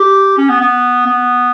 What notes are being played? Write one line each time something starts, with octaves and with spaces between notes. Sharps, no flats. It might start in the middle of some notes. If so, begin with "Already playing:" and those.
Already playing: G4
C#4
B3
B3
B3